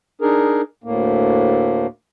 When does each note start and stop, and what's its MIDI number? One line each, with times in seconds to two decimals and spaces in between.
0.21 0.62 62
0.21 0.62 63
0.21 0.62 68
0.21 0.62 70
0.84 1.87 38
0.84 1.87 45
0.84 1.87 58